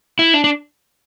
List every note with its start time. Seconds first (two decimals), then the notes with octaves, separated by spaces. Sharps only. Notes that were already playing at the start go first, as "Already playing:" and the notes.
0.19 E4
0.34 D4
0.44 D4